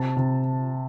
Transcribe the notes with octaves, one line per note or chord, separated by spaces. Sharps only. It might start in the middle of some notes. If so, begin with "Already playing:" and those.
Already playing: C3 A5
C3